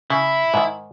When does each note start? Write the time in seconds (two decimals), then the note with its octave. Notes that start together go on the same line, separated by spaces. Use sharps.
0.10 C#3 E4
0.54 G#2 D#3